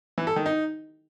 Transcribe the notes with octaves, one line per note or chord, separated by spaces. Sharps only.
E3
A4
D#3
D#4